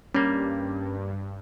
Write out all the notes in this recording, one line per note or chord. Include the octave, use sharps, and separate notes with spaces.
G2 G3 A#3 C#4